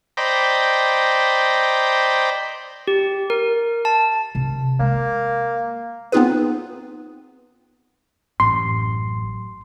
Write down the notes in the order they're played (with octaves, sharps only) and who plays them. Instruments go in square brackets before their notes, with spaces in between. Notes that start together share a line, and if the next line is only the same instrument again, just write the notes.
[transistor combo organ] C5 D5 D#5 G5 A#5 B5
[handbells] G4
A#4
A5
[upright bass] C3
[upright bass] G#3 [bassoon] A#3
[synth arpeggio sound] B3 C4 D#4 F4 G#4 B4
[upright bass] A1 F#2 [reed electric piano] C6